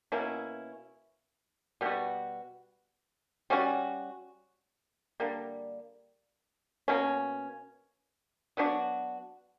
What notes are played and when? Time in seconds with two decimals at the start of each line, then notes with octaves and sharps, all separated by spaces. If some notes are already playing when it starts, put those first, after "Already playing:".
0.12 B2 A#3 C#4 E4
1.81 B2 G3 B3 F#4
3.50 G3 C#4 F#4
5.20 D3 G3 A#3
6.88 B2 A#3 C#4
8.57 F#3 B3 D4 F#4